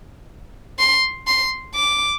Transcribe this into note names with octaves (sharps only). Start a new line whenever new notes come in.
C6
C6
D6